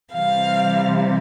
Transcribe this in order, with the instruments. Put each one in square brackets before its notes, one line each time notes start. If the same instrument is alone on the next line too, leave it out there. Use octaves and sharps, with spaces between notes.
[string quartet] C3 E3 G3 F5